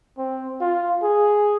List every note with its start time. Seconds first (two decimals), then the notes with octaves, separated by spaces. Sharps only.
0.18 C4
0.61 F4
1.03 G#4